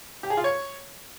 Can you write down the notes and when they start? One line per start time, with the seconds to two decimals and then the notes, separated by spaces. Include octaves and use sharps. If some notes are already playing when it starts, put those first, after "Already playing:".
0.23 G4
0.30 G#4
0.37 F4
0.44 C#5